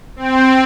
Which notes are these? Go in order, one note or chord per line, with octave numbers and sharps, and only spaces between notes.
C4